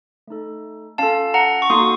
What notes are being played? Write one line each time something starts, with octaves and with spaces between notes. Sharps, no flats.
A3 D#4 A4
C#4 F4 A4 F5 A5
F#5 A#5
C#6
A#3 D#4 F#4 A4 C6 D#6